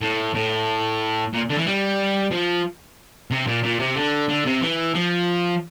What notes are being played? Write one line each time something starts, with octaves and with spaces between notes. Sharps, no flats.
A2
A2
A#2
D3
E3
G3
F3
C3
A#2
A#2
C3
D3
D3
C3
E3
F3